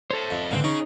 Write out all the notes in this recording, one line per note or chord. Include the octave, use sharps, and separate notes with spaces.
A4 C5 C#5 E5
F2
C#2 G#2 D3 E3 A#3 C4
C#4 D#4 G#4 C#5